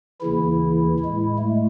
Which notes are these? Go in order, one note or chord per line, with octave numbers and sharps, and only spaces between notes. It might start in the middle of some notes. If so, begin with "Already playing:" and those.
D#2 C#3 E3 E4
A2 G#3
A3